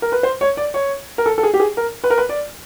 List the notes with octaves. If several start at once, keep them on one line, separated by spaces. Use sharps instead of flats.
A#4
B4
C5
C#5
D5
C#5
A#4
A4
A4
G#4
G4
G#4
A#4
B4
A#4
B4
D5